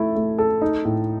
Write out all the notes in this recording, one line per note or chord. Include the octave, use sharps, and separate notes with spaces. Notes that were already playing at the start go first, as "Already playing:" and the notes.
Already playing: A3 E4
A3
A4
D#4
A2